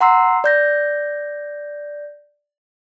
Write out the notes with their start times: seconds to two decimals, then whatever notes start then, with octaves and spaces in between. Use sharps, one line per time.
0.01 F#5 A#5 C6 E6 C7
0.44 D5 G6 A#6